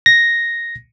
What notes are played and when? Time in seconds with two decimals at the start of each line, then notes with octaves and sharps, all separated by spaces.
0.06 A#6